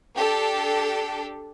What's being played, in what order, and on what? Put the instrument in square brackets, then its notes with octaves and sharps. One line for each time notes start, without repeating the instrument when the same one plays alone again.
[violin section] D4 G4 A4